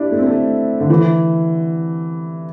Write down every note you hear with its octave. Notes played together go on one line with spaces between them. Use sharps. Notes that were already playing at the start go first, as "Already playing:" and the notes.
Already playing: D4 E4 G4
A3
C4
A3
D3
E3